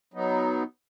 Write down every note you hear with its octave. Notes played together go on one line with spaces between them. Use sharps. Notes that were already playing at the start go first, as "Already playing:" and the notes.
F#3 B3 D#4